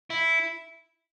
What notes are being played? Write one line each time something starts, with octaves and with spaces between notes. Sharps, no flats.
E4